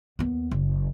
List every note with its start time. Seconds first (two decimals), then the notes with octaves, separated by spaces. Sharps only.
0.19 D#2 B3
0.51 F#1